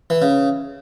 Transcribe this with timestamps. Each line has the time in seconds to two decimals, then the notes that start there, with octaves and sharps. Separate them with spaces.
0.10 E3
0.22 C#3